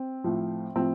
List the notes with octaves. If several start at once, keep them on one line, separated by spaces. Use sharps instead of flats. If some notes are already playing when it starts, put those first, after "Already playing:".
Already playing: C4
A2 F3
A2 F3 C4